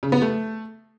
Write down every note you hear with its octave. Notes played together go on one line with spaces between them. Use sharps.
C#3
B3
A3